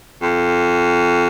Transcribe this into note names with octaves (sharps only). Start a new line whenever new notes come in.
F2